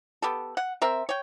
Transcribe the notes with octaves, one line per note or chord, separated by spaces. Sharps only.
B3 G4 A4
F#5
C4 A#4 E5
C#5 G5